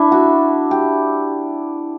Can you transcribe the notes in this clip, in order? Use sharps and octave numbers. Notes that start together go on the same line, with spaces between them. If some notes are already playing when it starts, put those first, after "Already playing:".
Already playing: D4 E4
F#4
G4